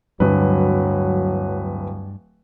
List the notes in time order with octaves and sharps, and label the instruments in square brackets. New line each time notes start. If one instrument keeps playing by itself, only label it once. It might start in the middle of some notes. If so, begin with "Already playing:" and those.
[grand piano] D1 B4 [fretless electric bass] G2 [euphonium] F#3